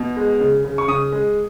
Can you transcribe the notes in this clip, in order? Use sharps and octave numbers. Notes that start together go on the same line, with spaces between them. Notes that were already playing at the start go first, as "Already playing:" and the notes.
Already playing: B2
G#3
C#3
C#3
C#6
C#3 D#6
G#3